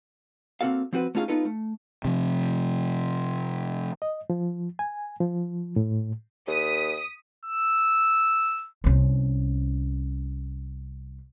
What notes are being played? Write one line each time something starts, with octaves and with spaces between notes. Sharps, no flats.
A#3 C4 C#4 F#4 A4 F5
F3 C4 F#4 B4
A3 C#4 D#4 F4 G#4 F5
B3 D#4 F4 A4 B4
A3
C3 F3
D#5
F3
G#5
F3
A2
D#2 D#6 B6
E6
C2 C#4